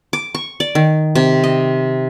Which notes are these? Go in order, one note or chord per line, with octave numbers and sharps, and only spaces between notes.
D6
C#6
D5
D#3
C3
D#5